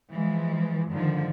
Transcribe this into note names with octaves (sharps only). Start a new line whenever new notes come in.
E3 F3 G#3
G#2 D3 D#3 F3